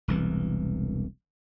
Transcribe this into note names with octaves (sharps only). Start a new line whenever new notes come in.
E1 C2 E3